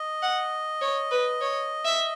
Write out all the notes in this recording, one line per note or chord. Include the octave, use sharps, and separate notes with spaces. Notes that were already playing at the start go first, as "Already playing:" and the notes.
Already playing: D#5
F#5
C#5
B4
C#5
E5